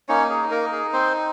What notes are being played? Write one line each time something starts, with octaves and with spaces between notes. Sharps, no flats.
A#3 C#4 D#4 C#5
G#4
A#3 A#4
G#4
C4 C5